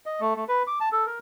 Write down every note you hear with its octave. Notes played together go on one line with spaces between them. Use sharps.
D#5
A3
A3
B4
D6
A5
A4
A#4